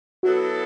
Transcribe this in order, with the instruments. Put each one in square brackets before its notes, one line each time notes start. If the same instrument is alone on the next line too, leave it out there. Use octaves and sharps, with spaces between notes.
[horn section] F#3 B3 E4 A4 [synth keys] F#4